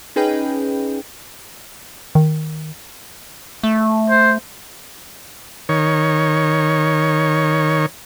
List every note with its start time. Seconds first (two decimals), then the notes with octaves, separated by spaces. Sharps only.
0.16 C#4 D#4 G#4 B4 G5
2.15 D#3
3.63 A3
4.09 C5
5.69 D#3 C#5